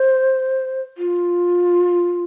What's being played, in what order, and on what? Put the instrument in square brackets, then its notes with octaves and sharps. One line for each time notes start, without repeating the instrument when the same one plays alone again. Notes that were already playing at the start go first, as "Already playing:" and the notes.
Already playing: [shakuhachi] C5
F4